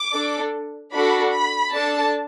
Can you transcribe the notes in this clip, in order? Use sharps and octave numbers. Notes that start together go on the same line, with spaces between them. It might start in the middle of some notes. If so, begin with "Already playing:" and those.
Already playing: D6
D4 A4
D4 F#4 A4 B5
B5
D4 A4 A5